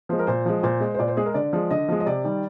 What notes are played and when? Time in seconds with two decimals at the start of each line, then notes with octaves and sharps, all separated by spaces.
0.09 F3 G#3 C5
0.19 A#4
0.27 A#2 C5
0.45 F3 G#3
0.63 A#2 C5
0.81 G#3
0.95 C5
0.99 A#2 D5
1.08 C5
1.17 G#3 G#4
1.26 A#4
1.34 D3 D5
1.53 F3 G#3
1.71 D3 D#5
1.89 F3 G#3
2.00 D#5
2.06 C3 D5
2.24 D#3 G3